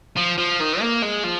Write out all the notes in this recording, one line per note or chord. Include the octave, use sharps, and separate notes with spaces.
F3
F3
D#3
A#3
G#3
F3